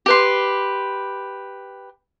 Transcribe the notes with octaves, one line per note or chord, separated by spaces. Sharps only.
G4 B4 C6